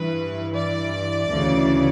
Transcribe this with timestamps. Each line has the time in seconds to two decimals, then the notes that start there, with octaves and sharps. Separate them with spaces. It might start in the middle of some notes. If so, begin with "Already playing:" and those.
Already playing: G2 E3 B4
0.54 D5
1.30 D2 C#3 E3